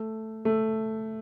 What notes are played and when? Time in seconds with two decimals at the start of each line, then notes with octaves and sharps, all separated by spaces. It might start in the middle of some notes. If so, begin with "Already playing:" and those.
Already playing: A3
0.45 A3